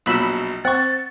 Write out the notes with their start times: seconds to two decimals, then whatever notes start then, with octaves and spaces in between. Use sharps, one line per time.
0.06 A#1 B2 F#3 B5 E6
0.65 C4 F#5 C#6 A6